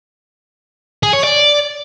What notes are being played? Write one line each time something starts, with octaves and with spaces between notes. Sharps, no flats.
G#4
C#5
D5